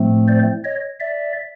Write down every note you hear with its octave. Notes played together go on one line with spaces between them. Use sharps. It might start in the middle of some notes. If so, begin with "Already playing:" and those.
Already playing: A2 F3 A3 C4
C5 D5
C#5 D#5
D5 E5